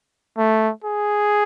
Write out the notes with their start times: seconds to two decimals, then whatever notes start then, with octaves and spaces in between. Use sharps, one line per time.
0.38 A3
0.84 G#4